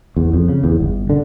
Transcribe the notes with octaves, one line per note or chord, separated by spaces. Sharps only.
E2
F2
C#3
E2
G1
D3